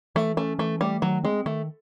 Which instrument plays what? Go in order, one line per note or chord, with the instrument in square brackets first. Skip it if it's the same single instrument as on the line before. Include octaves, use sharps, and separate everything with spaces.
[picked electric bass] E3 [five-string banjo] A3
[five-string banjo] A3 [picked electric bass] C#4
[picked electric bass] E3 [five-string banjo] A3
[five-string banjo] G3 [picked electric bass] A3
[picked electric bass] D#3 [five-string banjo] F#3
[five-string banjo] G#3 [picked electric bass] C4
[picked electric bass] D#3 [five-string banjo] A3